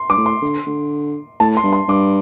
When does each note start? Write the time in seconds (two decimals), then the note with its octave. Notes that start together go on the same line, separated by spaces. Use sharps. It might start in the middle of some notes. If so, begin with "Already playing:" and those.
Already playing: C6
0.10 G2 D6
0.18 A2
0.26 C6
0.42 D3
0.67 D3
1.40 A2 A5
1.57 C6
1.64 G2
1.73 C6
1.88 G2 D6